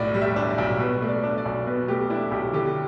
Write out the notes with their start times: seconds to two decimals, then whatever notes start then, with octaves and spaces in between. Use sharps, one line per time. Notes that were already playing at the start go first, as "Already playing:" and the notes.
Already playing: B1 A2 D5
0.14 G3
0.21 E5
0.36 D4
0.50 D5
0.58 B1
0.79 B2 B4
1.02 A3
1.09 D5
1.24 D4
1.38 D5
1.46 B1
1.67 B2 B4
1.88 A3 G4
2.10 D4 E4
2.31 B1 G4
2.54 D3 G4